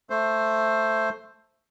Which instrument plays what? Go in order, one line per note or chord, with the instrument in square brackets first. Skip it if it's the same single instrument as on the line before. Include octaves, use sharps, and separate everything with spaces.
[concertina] A3 C5